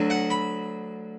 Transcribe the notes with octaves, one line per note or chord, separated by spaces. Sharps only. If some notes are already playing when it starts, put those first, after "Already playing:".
Already playing: D2 D3 F#3
F#5
B5